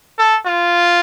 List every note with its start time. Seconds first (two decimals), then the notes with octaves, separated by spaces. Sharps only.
0.18 A4
0.46 F4